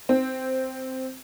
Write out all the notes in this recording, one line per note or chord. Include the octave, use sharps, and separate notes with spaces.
C4